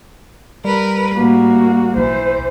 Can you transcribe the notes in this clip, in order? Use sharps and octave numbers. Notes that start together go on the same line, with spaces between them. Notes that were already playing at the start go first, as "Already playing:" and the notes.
G3 A#4 B4
A2 A#3 F#4
B1 E3 C5